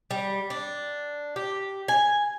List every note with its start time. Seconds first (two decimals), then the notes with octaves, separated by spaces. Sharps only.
0.11 G3
0.50 D4
1.36 G4
1.88 G#5